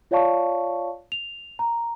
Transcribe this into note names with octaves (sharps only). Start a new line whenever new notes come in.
F4 C#5 D5 F5 A5 C#6
F7
A#5